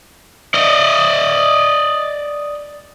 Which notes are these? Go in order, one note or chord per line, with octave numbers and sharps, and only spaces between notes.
D5 D#5